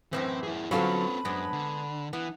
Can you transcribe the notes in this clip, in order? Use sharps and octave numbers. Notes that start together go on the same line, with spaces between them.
F#2 A2 C#3 E3 C4
E4 G#4
D3 F#3 C4 C#4 F4 A4 B4 B5
F#2 G#3 B3 D4
D3
E3 B3